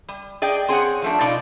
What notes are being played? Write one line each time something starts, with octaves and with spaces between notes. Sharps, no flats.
G3
G#4 D5 D#5 G5
C4 G#4 C#5 F#5
F3 A3 D4
B2 D#4 F4 D5